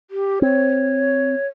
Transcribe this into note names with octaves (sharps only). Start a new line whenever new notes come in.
G4
C4 C#5